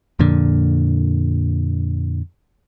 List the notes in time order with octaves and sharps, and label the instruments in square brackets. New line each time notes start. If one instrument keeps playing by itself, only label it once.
[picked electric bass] F2 A#2 D3